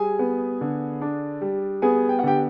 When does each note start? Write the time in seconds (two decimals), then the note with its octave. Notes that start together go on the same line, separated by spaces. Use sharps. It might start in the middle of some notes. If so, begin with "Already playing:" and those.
Already playing: G3 G#4 G#5
0.19 B3
0.61 D3
1.01 D4
1.41 G3
1.82 B3 G#4 G#5
2.09 G5
2.19 F#5
2.23 D3 G4 G5